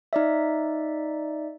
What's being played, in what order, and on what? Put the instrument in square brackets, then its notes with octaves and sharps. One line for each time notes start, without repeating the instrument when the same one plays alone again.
[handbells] D#4 D5 E5